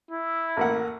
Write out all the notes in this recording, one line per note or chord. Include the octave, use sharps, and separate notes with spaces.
E4
A1 A#3 F#5